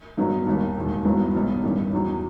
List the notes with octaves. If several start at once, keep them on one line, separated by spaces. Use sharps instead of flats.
G2 D#3 F#3 B3 D#4
D#2 D#3 G3
E1 D#2 D#3
G1 G2 F#3 B3 E4
B1 B2 G3 D#4
A1 G2 D#3 G3
E2 D#3 F#3